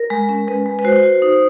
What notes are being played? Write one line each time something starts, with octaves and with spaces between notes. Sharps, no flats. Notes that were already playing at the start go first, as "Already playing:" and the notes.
Already playing: A#4
G#3
C#4
G#3 B4
G#3
B4
F#4 C5
F#4
D#4